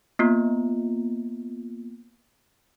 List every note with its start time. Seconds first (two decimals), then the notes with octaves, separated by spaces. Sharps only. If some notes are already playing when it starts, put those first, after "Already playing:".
0.19 A#3 B3 F4